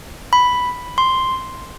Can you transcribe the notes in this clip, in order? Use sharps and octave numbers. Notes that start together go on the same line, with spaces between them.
B5
C6